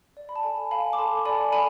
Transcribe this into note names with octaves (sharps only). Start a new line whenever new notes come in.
D5
B5
A5
A4 G#5
F5 G#5 B5
D6
A4 A5 C6
D5 G#5 B5
A4 G#5 B5